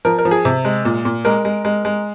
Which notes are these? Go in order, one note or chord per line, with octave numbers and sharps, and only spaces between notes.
F3 A#4
A#4
F3
G#4
C3
G#3
A#2
A#2
G#3 A#4
G#3
G#3
G#3